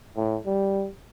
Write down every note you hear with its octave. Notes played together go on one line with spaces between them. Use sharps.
A2
G3